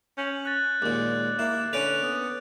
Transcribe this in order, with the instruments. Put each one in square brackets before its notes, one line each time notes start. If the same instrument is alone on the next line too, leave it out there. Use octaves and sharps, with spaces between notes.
[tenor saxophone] C#4 [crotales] G6 F#7
[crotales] F#6 A6
[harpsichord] D#2 A#2 [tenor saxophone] G#3 [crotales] D6
[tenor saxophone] A#3 [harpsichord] E4
[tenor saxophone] D3 [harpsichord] C#4 B4 [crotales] F#6 D7 F7
[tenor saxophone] B3